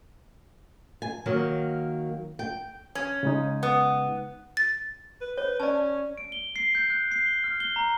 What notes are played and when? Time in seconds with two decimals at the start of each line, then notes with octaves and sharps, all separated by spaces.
1.02 G#5
1.26 D#3 F#3 A#3
2.39 G5
2.95 C#4
3.23 C#3 G#3 D#4
3.63 B3
4.57 A6
5.21 B4
5.37 B4 C#5
5.60 C#4 D5 A5
6.18 D7
6.32 G7
6.56 C7
6.75 G6
6.90 F#6
7.11 C7
7.26 G7
7.44 F6
7.60 G7
7.76 A#5